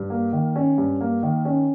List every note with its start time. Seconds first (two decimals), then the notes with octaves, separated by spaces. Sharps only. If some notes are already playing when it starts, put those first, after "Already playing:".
Already playing: G2
0.10 A#3
0.33 D#3
0.56 C#4
0.78 G2
1.01 A#3
1.23 D#3
1.45 C#4